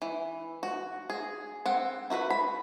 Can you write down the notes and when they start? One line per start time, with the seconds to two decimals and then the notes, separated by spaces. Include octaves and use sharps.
0.02 E3
0.63 F#4
1.10 G#4
1.66 C4 F#5
2.10 E4 F#4 A#4 B4
2.30 B5